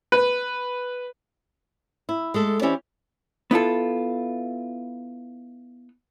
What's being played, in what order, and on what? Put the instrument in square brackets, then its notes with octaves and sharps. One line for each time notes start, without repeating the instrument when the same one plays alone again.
[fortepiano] B4
[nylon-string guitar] E4
G#3 A3 A4
E3 C#4 E4 G4 C5 D5
[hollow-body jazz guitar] B3 E4 F4 A4